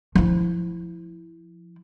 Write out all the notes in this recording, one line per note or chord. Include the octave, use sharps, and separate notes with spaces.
F3 E4